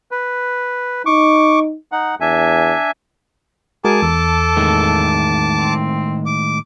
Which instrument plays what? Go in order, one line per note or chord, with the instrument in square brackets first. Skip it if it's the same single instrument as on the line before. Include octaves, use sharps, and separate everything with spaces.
[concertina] B4
[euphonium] D#4 [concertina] C#6 D6
[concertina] D#4 F#5
[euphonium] E2 [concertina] D4 E5 G#5
[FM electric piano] G#3 F#4 A#4 [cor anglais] G#4 [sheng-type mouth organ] A5 D6
[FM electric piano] E2 [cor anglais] A4
[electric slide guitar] A2 D#3 G#3
[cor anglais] C4
[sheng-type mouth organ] D6